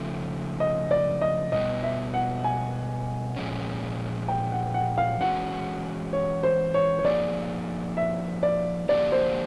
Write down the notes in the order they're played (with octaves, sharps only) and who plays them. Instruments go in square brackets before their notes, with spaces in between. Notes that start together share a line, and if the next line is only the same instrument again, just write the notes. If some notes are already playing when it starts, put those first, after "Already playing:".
Already playing: [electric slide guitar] C#3 F3 A3
[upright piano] D#5
D5
D#5
[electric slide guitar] B2 G3 B3 [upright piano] D#5
[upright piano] E5
F#5
G#5
[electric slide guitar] A#2 F3 G#3 C#4
[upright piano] G5
F#5
F#5
F5
[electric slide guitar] E3 G#3 C#4 F#4 [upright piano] F#5
[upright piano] C#5
C5
C#5
C#5
[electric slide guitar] F3 A#3 D#4 G#4 [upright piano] D5
[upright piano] E5
D5
[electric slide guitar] D3 F3 A#3 D4 G4 [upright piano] D5
[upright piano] C5